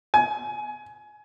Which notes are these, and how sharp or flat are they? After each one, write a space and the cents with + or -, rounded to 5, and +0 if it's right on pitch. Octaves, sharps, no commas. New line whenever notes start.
G#5 +20